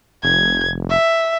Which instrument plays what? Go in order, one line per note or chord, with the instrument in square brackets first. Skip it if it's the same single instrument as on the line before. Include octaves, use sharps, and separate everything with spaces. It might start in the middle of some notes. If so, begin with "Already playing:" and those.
[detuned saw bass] F1 [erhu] G#6
[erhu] E5